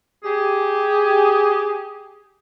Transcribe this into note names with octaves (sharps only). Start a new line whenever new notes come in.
G4 G#4